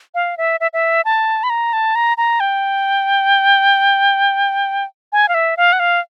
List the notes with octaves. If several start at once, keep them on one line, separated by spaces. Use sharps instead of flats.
F5
E5
E5
E5
A5
B5
A#5
A5
A#5
A#5
G5
G#5
F5
E5
F5
F#5
F5